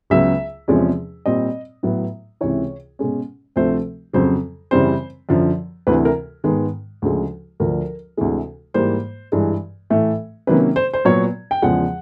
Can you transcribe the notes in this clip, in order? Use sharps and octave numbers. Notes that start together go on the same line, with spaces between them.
C#2 C#3 F#3 B3 E5
E2 C3 F3 G#3 C#4
A#2 G3 C4 D#5
A2 F#3 B3
C#2 C3 E3 C#5
B2 G#3 C#4
D2 C3 F3 A3 C4 C5
F2 C#3 F#3 C5
F#2 C#3 E3 G3 C4 C5
F#2 D3 F3
D2 C3 E3 B4
A#4
G#2 D#3 G#3 B3
D2 C#3 F3 G#3
D2 D3 F3 A#4
D2 C3 E3 G#3
G#2 E3 G3 A#3 C5
G2 E3 G#3
A2 E3 A3
C3 D#3 F#3 A#3 C#4 B4
C5
C5
A#2 F#3 B3 C#5
G5
E2 C#3 F3 G#3 F#5